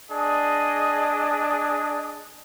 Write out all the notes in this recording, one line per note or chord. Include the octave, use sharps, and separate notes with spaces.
D4 G#4 D#5